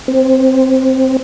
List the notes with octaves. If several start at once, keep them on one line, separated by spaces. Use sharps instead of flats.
C4